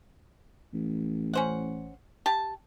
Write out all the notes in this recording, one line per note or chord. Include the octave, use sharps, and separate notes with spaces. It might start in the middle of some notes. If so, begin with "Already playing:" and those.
A1
C#4 C5 F#5
G4 A5